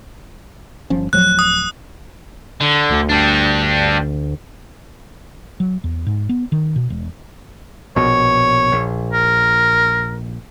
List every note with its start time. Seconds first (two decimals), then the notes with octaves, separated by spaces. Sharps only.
0.90 G1 F3 C#4
1.13 D1 F3 F#3 F#6
1.39 D#6
2.61 D3
2.90 D2
3.09 G3 D4
5.60 F#3
5.84 E2
6.07 G#2
6.29 B3
6.52 D#3
6.76 B2
6.90 E1
7.96 A#1 B2 C#5
8.72 A#1
9.13 A#4